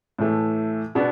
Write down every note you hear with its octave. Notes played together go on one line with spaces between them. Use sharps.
A2 E3 A3
B2 B3 D4